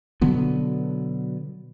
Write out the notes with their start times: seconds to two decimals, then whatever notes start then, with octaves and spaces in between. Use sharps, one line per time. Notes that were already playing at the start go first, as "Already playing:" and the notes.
0.21 B2 D3 F#3 B3